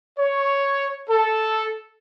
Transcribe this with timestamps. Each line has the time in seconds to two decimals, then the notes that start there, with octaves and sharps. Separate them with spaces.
0.18 C#5
1.09 A4